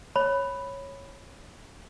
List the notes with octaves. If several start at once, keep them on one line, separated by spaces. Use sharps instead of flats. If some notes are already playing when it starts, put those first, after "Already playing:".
C#5 B5